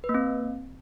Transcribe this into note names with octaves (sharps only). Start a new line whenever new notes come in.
B4
A#3
C4